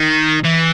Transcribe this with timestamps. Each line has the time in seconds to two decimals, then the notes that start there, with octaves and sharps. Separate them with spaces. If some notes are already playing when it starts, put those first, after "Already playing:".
Already playing: D#3
0.44 E3